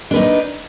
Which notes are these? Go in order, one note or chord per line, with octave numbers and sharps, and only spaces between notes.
D4 D#4 B4